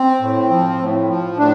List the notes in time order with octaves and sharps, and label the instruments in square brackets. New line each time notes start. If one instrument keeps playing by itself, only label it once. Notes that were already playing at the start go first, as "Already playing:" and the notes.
Already playing: [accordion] C4
A2
F3
A2
F3
A2 D4